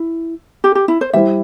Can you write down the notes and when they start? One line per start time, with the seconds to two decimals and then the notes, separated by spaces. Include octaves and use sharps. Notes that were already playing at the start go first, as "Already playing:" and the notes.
Already playing: E4
0.64 G4
0.75 G4
0.88 E4
1.01 C5
1.13 G3 E4 C5 E5